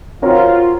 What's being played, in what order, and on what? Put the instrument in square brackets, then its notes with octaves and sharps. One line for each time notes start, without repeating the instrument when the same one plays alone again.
[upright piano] C4 F#4 A#4 C#5 [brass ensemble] F4